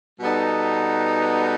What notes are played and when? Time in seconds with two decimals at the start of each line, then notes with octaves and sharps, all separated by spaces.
0.19 B2 G3 B3 D#4 A4